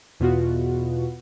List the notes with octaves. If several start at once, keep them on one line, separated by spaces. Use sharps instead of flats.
E2 B2 B3 F4 F#4